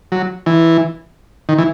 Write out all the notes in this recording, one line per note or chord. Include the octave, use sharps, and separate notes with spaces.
F#3
E3
D#3
E3